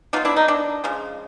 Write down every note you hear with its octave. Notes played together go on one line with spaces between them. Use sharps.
F#3 B3 D4 D#4 F4
D4 E4
D#4
D4
C#3 F3 G#3